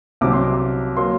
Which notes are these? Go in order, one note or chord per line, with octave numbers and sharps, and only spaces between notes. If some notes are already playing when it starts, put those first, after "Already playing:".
C2 C3 F#3 D6
C6
D6
F#3 A#3 C6